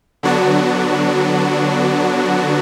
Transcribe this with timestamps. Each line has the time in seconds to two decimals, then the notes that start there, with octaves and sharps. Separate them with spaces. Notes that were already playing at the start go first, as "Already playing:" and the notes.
0.23 D3 F#3 B3 D4 F#4